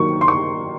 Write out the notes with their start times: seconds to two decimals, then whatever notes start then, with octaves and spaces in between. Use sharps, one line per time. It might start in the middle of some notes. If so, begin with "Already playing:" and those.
Already playing: D#3 F#3 A#3 D#4 C#6
0.21 C6
0.28 C#6